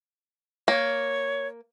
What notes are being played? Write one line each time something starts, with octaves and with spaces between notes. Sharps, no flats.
A#3 C#5